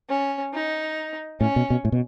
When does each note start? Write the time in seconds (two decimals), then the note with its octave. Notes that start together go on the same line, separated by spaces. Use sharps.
0.09 C#4
0.53 D#4
1.41 A2 C#4
1.56 B2
1.70 B2
1.85 A2
1.92 B2